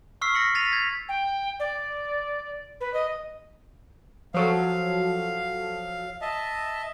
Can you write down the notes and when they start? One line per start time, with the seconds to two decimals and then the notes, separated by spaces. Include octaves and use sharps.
0.21 C#6 E6 F6 B6 C7
0.35 A#6 B6 C#7 F#7
0.55 A6 B6 D#7 F7
0.72 G#6 A6 B6
1.08 G5
1.59 D5
2.80 B4
2.94 D#5
4.34 F3 F#3 A4 F5
6.22 D#5 E5 A5